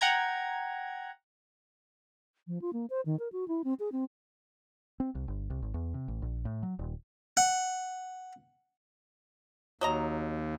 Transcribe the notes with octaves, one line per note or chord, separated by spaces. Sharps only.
F#5 G5 A#5 G#6
F3
F4
A#3
C5
D#3
A#4
F#4
E4
C4
G#4
C4
C4
C2
G1
C2
G#1
E2
C3
A1
A#1
A2
F#3
D#1
F#5
D#2 F#3 D#5 A#5